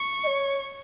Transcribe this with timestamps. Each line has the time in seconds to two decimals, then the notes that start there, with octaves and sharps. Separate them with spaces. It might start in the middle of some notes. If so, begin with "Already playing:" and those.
Already playing: C#6
0.23 D#5
0.27 C#5